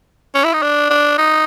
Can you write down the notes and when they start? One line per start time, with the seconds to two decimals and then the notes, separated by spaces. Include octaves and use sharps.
0.34 C#4
0.44 E4
0.53 D#4
0.62 D4
0.90 D4
1.18 D#4